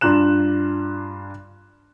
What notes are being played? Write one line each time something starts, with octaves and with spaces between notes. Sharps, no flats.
G2 D4 F4 A#5 F#6 E7